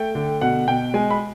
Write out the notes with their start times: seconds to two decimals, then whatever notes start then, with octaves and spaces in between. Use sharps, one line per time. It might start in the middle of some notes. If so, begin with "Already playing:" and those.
Already playing: A3 G5
0.15 D3
0.41 B2 F#5
0.68 B2 G5
0.94 G#3 G#5
1.11 B5